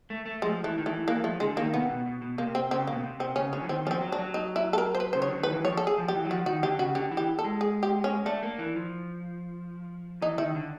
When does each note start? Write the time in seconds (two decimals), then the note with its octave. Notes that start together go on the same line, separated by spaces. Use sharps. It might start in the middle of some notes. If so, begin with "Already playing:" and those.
0.10 A3
0.26 A3
0.42 F3 G#3
0.64 E3 A3
0.78 D#3
0.86 E3 A3
1.08 E3 A#3
1.24 F3 A3
1.40 D3 G#3
1.56 D#3 A#3
1.73 C3 B3
1.89 B2
2.06 B2
2.22 B2
2.38 C3 A#3
2.55 C4
2.71 C#3 C4
2.87 A#3
2.92 B2
3.03 C3
3.20 C3 C4
3.36 C#3 C#4
3.53 D3 C#4
3.62 E3
3.68 D#3 C4
3.85 F3 C#4
3.91 C4
4.01 F#3
4.12 D4
4.19 F#3
4.34 D#4
4.56 E4
4.73 A4
4.78 A#4
4.95 C5
5.00 B4
5.13 C#3 C5
5.22 C#5
5.27 D3
5.41 D#3 B4
5.52 E3
5.65 F3 C#5
5.77 A4
5.87 G#4
5.98 F3
6.08 G4
6.14 E3
6.25 F#3
6.30 F3 F#4
6.46 D#3 F#4
6.63 D3 G4
6.79 C#3 F#4
6.95 D3 G4
7.11 E3
7.17 G4
7.39 A4
7.44 G#3
7.61 G#4
7.83 G4
8.04 C#4
8.26 A3 D4
8.43 A#3
8.59 E3
8.76 F3
10.22 E3 D#4
10.38 D#3 E4
10.55 D3